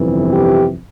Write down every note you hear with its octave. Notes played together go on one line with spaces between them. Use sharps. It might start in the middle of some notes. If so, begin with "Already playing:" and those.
Already playing: G1 F2 C3 E3
G4